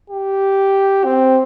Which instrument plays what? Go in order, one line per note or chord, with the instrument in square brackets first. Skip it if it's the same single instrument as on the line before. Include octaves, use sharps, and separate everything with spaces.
[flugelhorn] G4
C4